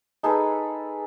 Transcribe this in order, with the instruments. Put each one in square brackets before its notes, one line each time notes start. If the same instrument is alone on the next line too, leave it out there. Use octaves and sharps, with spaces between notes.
[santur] D#4 G#4 A4 B4